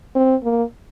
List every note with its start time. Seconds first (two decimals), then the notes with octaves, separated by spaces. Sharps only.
0.16 C4
0.44 A#3